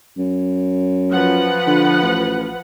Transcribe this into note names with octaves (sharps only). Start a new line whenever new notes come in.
F#2
F3 B4 F#5
D3
A1